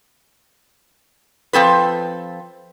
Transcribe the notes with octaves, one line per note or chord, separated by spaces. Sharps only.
F3 C4 A4 B4